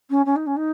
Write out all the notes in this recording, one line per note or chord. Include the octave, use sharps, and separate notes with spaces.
C#4
C#4
D#4
C#4
D#4